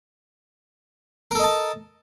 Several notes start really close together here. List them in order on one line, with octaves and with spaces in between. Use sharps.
A#4 A4 D#5 A5